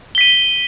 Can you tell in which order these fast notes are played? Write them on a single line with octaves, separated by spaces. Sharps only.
G7 B6 D#7